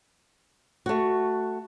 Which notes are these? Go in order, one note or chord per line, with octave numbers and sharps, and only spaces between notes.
A3 F#4